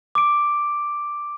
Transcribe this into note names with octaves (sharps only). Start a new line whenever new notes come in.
D6 D7